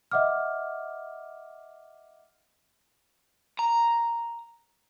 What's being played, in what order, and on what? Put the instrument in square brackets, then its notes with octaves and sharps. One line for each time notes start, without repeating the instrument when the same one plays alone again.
[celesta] D#5 E5 F#5 D6 F6
[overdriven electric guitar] A#5